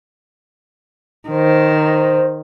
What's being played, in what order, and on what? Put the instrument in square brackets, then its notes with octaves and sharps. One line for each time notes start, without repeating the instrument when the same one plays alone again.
[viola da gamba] D#3 [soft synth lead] C5